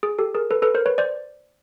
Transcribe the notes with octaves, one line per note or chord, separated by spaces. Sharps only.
G#4
G4 A4
G#4 A#4
A4 B4
A4 B4
A#4 C5
B4 C#5
C5 D5